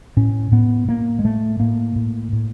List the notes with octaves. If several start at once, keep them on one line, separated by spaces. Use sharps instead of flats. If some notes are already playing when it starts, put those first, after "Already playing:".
A2 C#4
A2 B3
A2 A#3
G#3
A2 A3
A2 A#3
A2
A2